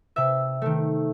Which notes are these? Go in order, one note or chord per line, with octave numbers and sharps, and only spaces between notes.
C3 E5
D#3 A3